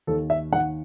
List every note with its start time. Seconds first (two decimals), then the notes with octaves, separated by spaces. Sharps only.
0.07 D#2 A4
0.30 E5
0.52 D#3 F#5